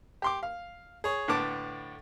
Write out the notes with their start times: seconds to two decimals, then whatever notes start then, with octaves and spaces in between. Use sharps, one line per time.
0.22 G4 C6 D6
0.43 F5
1.04 G#4 C#5
1.28 A2 D3 B3 A5 D6